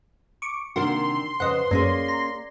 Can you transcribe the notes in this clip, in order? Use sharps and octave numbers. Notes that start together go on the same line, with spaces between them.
C#6 D6
C3 D#3 A#3 D4 F#4 C6
F2 G#2 C#3 B4 C5 D#5 F#5
F#2 A#3 C#4 G#4 D5 A#6
A#5